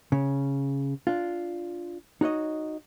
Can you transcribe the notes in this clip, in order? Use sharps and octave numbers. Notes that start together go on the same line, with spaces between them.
C#3
D4 F4
D#4 F#4 C#5 D#5